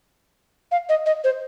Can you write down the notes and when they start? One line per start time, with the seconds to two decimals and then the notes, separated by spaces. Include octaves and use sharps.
0.72 F5
0.89 D#5
1.06 D#5
1.24 C5